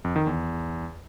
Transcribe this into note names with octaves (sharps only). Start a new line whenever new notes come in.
F2
D#3
E2